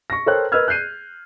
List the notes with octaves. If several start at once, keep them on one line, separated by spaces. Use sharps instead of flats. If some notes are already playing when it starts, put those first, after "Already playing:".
C#6 A#6
A4 A#4 C5 C#5 G5 F#6
A#4 B4 D#5 E6 F6 G#6
F#6 G6 C7 D#7